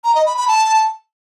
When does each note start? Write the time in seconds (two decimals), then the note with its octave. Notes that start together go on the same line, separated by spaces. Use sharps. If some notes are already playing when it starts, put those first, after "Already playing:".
0.04 A#5
0.15 D#5
0.26 B5
0.37 B5
0.48 A5